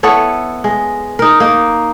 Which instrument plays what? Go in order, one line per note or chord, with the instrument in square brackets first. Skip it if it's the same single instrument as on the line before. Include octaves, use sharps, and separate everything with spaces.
[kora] B3 E4 A4 C#5
G#3
D#4 A#4
A#3 D#4